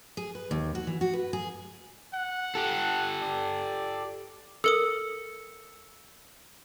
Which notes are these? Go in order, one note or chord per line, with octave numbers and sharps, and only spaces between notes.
G#4
B4
D#2
F#4
E3
F#4
B4
G#4
F#5
G4 A4
D5
A4 A#4 D#6 E6 C#7